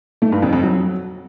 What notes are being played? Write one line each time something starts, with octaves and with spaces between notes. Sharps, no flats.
A3
G2
F2
F2
F#3